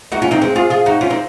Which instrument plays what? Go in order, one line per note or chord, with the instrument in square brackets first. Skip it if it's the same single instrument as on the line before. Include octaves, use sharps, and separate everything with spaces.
[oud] D#4 F#4
C#4 F4
C4 D#4
G#3 C4
F4 G#4
F4 G#4
D#4 F#4
C#4 F4
C4 D#4